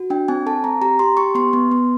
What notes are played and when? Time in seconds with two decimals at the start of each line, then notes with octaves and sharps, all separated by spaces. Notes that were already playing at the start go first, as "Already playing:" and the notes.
Already playing: F#4
0.10 D4 G5
0.28 C4 G#5
0.46 A4 A5
0.64 C4 A#5
0.82 G4 A#5
0.99 G4 C6
1.17 G4 C#6
1.35 B3 C6
1.53 B3
1.71 B3